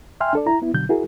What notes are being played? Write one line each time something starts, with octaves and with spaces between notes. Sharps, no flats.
E5 G5 G#5 C6 F6
D4 A4 D5
E4 A#5
B3 E4
B2 D3 F#3 G6
E4 F#4 G#4 A#4